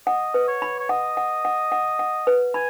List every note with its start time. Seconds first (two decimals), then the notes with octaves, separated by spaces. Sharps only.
0.07 D#5 F#5
0.34 B4
0.48 C#5
0.62 B5
0.79 C#5
0.89 D#5 F#5
1.17 F#5
1.45 F#5
1.72 F#5
1.99 F#5
2.27 B4
2.54 G#5 B5